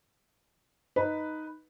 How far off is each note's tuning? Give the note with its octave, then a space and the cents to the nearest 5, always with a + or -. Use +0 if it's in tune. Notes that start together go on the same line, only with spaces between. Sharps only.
D#4 +0 B4 +0